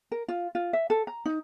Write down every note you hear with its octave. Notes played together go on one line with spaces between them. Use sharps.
A#4
F4
F4
E5
A4
A#5
D#4